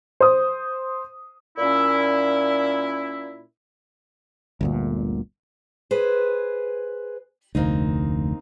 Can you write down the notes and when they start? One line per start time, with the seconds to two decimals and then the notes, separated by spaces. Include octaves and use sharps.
0.20 C5 D#6
1.58 A#2 C#4 E4
4.61 G1 D2 A#2
5.91 G#4 B4 C5
7.55 F1 D2 A#3 C4 D#4